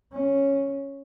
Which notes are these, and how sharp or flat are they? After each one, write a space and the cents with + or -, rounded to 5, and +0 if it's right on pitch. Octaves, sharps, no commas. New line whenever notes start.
C#4 -5